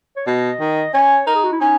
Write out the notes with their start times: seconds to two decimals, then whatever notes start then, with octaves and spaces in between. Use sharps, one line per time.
0.17 C#5
0.27 B2 D#5
0.60 D#3
0.94 C#4 C#5
1.27 D#4 A#4
1.35 G#4
1.44 F#4
1.52 E4
1.60 C#4 D#4